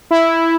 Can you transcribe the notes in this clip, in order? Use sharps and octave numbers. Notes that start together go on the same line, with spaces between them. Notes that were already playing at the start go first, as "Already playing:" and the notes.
E4